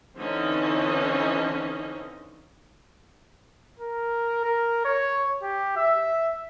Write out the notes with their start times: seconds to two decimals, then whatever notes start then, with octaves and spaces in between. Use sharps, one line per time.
0.16 D3 E3 C4 C#4 D#4 D#5
3.79 A#4
4.45 A#4
4.85 C#5
5.43 G4
5.77 E5